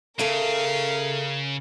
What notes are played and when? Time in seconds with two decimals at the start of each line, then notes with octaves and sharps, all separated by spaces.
0.19 C#3 A4 A#4 E5 F5